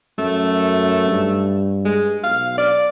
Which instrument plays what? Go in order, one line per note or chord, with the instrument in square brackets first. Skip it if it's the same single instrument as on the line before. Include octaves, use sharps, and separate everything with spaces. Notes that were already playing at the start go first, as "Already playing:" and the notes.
[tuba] F#2 [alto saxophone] A3
[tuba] G2
[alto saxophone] G#3
[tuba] B1 [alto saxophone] F5
[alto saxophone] D5